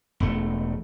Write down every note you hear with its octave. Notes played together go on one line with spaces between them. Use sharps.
E1 A3